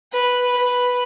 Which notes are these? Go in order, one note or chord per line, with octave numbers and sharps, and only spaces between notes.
B4
B4